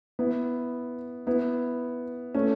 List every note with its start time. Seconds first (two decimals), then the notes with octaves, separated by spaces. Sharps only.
0.19 B3 E4
1.27 B3 E4
2.35 A3 C#4